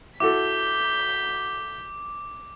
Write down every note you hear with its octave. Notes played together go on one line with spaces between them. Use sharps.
E4 F#4 A4 D6 G6 B6